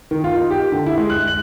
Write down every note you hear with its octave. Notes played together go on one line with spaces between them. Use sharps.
D#3
F4
D#4
G4
D3
E4
G#3
F#6
F#7